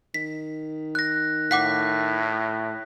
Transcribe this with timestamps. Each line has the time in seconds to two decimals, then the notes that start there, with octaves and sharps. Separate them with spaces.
0.14 D#3 B6
0.95 F#6 A#6
1.51 A2 F5 F#5 D6 F#6 B6